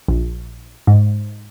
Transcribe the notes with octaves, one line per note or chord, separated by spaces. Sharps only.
A#1
G#2